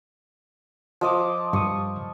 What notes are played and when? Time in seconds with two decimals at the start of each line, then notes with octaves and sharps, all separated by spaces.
1.01 F3 D#5 D6
1.53 G2 C#6 D#6